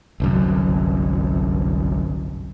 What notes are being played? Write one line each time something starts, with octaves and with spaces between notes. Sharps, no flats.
G1 C2 F#2